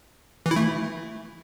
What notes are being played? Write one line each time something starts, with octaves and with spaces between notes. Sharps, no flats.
E3
E4
A3